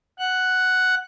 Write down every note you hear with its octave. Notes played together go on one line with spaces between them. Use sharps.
F#5 F#6